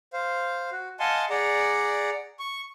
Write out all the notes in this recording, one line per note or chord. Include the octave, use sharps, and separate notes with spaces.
C5 F5
F#4
D#5 F5 F#5 G#5 A5 C6
G#4 D5 F#5 A#5
C#6